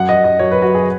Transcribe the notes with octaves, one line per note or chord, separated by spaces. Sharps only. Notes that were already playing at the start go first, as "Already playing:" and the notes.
Already playing: F#2 F#5
D#5
F#2
D#5
F#3 C#5
B4
F#2 F#4
G#4